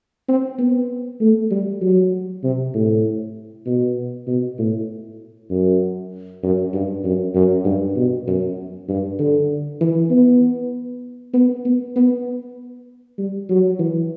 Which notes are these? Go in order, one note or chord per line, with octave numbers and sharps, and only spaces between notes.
C4
B3
A3
G3
F#3
C3
A2
B2
B2
A2
F#2
F#2
G2
F#2
F#2
G2
B2
F#2
G2
D3
E3
B3
B3
B3
B3
G3
F#3
E3